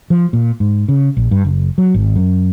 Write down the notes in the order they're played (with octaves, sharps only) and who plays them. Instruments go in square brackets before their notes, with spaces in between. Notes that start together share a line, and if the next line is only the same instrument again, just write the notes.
[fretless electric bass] F3
A#2
G#2
C#3
A#1
G2
F#1
F#3
G#1
F#2